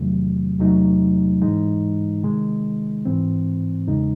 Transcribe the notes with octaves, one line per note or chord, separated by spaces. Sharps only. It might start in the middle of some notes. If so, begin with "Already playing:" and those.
Already playing: E2 C3 D#3 F#3 A3
E2 C3 F#3 A3 D#4
G#2 E3 G#3 D#4
C3 D#3 G#3
G#2 E3 C4
E2 C#3 G#3 D#4